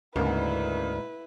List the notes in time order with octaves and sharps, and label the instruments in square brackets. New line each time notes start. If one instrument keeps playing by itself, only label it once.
[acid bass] D2 [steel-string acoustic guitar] G#2 [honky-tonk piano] C#3 A#3 [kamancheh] E4 B4